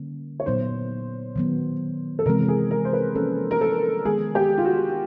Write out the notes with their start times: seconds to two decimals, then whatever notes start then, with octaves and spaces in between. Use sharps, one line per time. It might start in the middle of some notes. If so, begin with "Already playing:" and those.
Already playing: D3 G3 A#3 C#4
0.40 C#5
0.46 A#2 F#3 B3 D#4 C5
1.36 D#3 F#3 B3
2.19 A4
2.26 C3 E3 G#3 C4 A#4
2.48 G#4
2.71 A#4
2.85 C5
2.93 B4
3.16 F3 A#3 C#4 A4
3.51 A#4
3.61 A4
4.05 D#3 G#3 B3 G#4
4.35 G4
4.58 F4
4.65 F#4